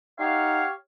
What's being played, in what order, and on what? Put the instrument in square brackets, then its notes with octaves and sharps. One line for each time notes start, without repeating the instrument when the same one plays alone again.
[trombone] D#4 [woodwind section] G4 C#5 F5 [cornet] F#5